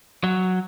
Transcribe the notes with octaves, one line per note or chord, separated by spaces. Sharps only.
F#3